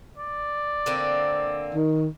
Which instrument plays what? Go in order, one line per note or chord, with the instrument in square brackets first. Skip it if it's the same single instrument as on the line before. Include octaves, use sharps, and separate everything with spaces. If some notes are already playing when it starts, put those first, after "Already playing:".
[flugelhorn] D5
[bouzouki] D3 A#3 C4
[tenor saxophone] D#3